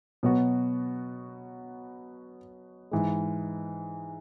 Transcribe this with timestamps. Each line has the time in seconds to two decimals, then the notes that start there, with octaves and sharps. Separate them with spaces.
0.23 B2 F#3 B3 F#4
2.91 G#2 E3 G#3